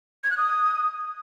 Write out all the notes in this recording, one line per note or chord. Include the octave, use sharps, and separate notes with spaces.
G#6
F#6
D#6